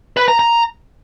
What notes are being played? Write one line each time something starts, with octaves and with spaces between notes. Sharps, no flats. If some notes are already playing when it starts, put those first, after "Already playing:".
B4
A#5
A#5